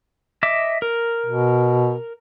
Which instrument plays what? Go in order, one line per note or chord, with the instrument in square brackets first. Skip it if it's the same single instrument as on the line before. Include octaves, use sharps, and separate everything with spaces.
[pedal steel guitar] D#5 E5 D6
A#4
[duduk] B2